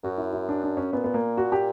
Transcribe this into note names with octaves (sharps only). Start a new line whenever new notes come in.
F#2 F#4
E4
E4
D4
D4
C#4
A#2 B3
B3
A#3
F#4
G4